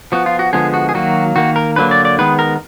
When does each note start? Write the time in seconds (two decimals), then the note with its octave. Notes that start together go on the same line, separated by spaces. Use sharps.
0.12 F3 B3 F#4
0.26 F4
0.39 F#4
0.53 D3 F3 G#3 B3 G#4
0.74 F#4
0.89 G#4
0.94 D#3 F#3 A#3 F#4
1.36 D#3 A#3 F#4
1.56 A#4
1.76 D3 F#3 A#3 B4
1.91 D5
2.05 D5
2.19 D#3 G#3 B3 B4
2.39 A#4